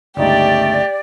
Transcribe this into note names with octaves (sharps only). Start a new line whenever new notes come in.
G1 C#2 A3 D#4 G4 D5